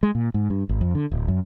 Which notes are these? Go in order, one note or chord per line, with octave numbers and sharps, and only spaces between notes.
G#3
A#2
G#2
G2
G#1
F2
D3
D1
F#2